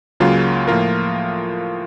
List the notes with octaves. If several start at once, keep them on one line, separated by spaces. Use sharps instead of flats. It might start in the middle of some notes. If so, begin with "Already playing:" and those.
C#2 C#3 F#3 A#3 F4
A2 F3 A#3 F4 A#4